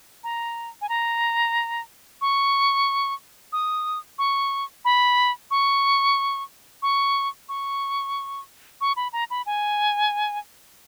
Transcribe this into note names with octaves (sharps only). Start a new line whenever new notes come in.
A#5
G#5
A#5
C#6
D#6
C#6
B5
C#6
C#6
C#6
C#6
B5
A#5
B5
G#5